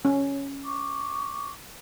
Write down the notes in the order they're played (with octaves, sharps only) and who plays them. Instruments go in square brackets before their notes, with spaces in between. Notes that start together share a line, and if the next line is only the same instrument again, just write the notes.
[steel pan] C#4
[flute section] C#6 D6